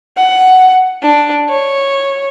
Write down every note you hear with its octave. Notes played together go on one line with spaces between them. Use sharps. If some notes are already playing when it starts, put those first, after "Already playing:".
F#5
D4
C#5